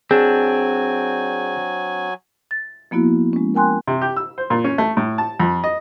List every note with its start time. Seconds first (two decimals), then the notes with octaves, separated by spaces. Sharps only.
0.11 F#3 C4 D4 G#4 G#5
2.51 A6
2.91 F3 A#3 B3 E4 F#4
3.33 G#3 C#4
3.54 A#4 G5 G#5 C6 F#6
3.88 C3
4.02 G4
4.16 E6
4.38 C5
4.50 A#2
4.64 C#4
4.78 A3
4.97 A2
5.18 A5
5.40 F2
5.64 D#5